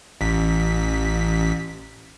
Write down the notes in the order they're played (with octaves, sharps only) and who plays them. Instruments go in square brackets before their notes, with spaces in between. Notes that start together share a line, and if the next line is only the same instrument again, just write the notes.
[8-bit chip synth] A1 B6